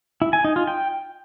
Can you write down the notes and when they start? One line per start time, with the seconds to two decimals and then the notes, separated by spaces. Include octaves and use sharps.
0.22 E4
0.33 G#5
0.45 D#4
0.56 F4
0.67 G5